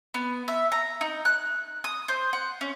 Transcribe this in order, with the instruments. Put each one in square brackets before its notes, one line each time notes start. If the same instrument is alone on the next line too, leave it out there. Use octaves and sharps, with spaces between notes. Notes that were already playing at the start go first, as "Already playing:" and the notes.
[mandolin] B3
E5
A#5
D#4
F#6
D#6
C5
F#5
C#4